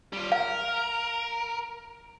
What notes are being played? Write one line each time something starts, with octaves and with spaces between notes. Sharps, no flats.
G3 F4
A#4 F5